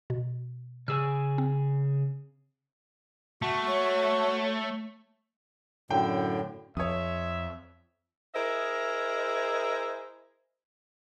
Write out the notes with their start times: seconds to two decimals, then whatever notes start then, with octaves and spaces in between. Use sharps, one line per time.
0.10 B2
0.88 C#3 G#4 G#5 E6
1.38 C4
3.42 A3 F#4
3.67 C#5
5.90 F#2 A2 D3 G5
6.77 F2 C#5 E5 D#6
8.34 E4 G#4 A#4 C5 D#5 E5